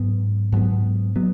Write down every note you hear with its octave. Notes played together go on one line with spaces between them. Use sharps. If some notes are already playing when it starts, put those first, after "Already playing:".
Already playing: G#2 F#3 B3
G#2 F#3 B3
F#3 B3